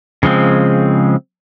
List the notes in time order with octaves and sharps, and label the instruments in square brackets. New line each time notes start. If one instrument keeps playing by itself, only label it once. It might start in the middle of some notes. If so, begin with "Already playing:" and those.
[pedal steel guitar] C#3 F3 G#3 C4